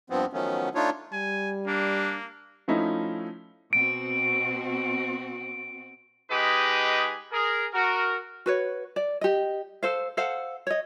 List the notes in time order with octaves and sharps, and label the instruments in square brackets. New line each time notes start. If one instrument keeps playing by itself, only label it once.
[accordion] G2 F3 B3 C4
D#3 F3 F#3 A3 B3 C#4
A3 D4 D#4 F4 C#5
[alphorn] G3 [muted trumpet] G#5
[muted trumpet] A#3 [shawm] D4
[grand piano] F3 A3 C#4 D#4 E4
[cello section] B2 C4 F#4 [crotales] D7
[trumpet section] G#3 D#4 G4 G#4 B4 D#5
G#4 A#4
F#4 A#4
[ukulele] F#4 B4 C#5
D5
G4 D#5
A4 C5 F5
A4 C5 F5 F#5
C#5 D#5